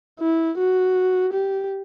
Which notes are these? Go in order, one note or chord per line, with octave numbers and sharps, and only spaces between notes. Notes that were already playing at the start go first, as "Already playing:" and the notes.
E4
F#4
G4